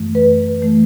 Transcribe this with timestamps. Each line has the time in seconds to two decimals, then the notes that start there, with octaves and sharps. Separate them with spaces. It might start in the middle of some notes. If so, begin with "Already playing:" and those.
Already playing: F#2 E3 A3
0.15 B4
0.62 E3 A3